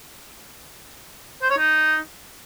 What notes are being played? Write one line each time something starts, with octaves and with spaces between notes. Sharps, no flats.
C5
C#5
D#4